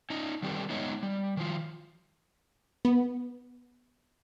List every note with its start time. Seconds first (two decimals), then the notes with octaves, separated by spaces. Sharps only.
0.10 C#4 D#4
0.43 D#3 G3 C4 G4 A4 B4
0.70 G#3 B3 D#4 C#5 D#5 E5
1.03 G3
1.37 D#3 F3 F4
2.85 B3